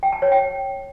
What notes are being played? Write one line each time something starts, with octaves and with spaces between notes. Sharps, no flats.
G5
A5
C#5
G5